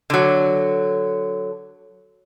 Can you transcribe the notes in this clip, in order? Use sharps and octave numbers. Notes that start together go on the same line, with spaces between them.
D3 F#3